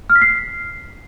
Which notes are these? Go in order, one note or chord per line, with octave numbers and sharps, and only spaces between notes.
F6
B6
C7